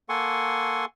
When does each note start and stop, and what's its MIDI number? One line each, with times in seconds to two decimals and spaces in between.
0.09 0.85 58
0.09 0.85 69
0.09 0.85 78
0.09 0.85 80
0.09 0.85 84
0.09 0.85 85